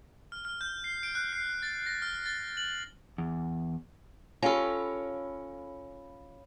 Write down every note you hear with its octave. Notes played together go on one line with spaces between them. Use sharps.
F6
F6
G6
C7
D7
F#6
C7
A6
A#6
F6
A6
F#7
E2
C#4 F4 G4 A4 C#5 F5 G#5 B5